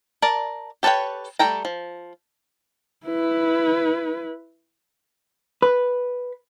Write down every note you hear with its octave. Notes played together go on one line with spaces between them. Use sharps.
A#4 D5 A5
G4 A4 B4 C#5 G5
G3 A3 A4 G5 A#5
F3
E4 B4
B4